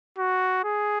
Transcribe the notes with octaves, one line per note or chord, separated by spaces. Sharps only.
F#4
G#4